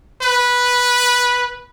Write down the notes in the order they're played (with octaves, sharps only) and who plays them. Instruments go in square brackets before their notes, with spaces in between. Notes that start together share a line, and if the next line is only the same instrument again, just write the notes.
[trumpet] B4